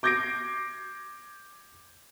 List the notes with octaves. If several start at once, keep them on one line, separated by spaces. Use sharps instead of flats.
D6 G6 G#6 A#6 C7 D7